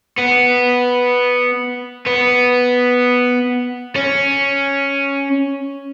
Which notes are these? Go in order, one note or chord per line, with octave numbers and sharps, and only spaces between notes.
B3
B3
C#4